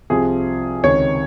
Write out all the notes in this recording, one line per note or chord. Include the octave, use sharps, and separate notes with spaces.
C2 C3 F3 G#4
C#2 C3 D#3 C#5